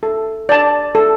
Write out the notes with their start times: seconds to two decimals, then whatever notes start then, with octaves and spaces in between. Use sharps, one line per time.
0.03 A4
0.49 D5 A5
0.95 A4